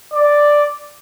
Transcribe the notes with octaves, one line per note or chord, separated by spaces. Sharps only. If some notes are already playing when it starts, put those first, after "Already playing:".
D5